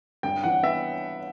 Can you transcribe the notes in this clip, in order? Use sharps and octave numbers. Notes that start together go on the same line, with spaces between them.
G2 G5
E3 F#5
B3 E5